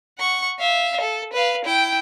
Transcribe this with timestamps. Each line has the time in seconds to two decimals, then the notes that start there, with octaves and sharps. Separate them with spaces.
0.18 F#5 C#6
0.59 E5 F5
1.01 A4
1.33 B4 F5
1.65 E4 G5